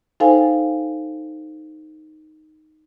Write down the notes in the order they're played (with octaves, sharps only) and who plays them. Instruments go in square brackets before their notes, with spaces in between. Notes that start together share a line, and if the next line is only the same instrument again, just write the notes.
[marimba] D#4 A4 C5 F5 G5 G#5